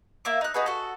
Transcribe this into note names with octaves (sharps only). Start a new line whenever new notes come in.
A#3 E5 D6
D#4 F#6
D#4 F#4 G#4 B4
F#4 A4